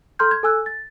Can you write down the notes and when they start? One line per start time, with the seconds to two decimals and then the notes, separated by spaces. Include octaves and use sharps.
0.19 A4 A#5 C6 F6 G6
0.31 G#6
0.43 A4 G#5 E6 F#6
0.66 A6